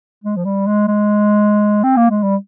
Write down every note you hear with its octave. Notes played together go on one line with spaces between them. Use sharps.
G#3
F3
G3
G#3
G#3
C4
A#3
G#3
G3